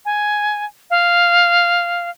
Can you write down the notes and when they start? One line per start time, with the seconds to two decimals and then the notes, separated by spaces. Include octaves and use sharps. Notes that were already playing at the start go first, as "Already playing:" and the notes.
0.05 G#5
0.90 F5